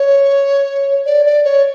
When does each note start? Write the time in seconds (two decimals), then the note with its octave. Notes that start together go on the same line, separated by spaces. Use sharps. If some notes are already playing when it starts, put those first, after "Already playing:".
Already playing: C#5
1.06 D5
1.25 D5
1.44 C#5